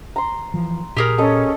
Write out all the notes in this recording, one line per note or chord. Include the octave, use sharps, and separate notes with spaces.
A#5 C6
E3 F3
A#2 G4 G#4 A#4
C#4 A4 D#5